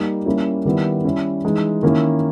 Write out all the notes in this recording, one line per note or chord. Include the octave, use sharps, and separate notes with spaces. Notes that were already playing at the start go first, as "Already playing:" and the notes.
Already playing: G3 A#3 D#4
G3 A#3 C#4 E4
D#3 G3 B3 E4
G3 C#4 E4
E3 G#3 D#4
D#3 A#3 C#4 E4